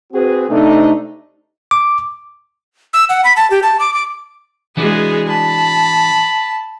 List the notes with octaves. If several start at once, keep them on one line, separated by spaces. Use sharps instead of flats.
C4 F#4 G#4 B4
C3 A3 D4 D#4
D6
E6
F#5
B5
A5
G4
A5
D6
D6
E3 G#3 B3 D4 F#4 G#4
A5 B5